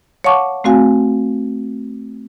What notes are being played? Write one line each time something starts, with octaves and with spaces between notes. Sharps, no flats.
C#5 F5 F#5 A5 C#6 D6
A3 C4 F#4 F5 G#5